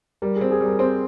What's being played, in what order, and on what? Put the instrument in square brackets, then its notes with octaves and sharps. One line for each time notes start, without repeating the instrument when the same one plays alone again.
[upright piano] G3 [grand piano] A#4
[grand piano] G#4
[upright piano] C4
[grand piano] G#4
[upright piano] G3
[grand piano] A#4
[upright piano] C4 [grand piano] C5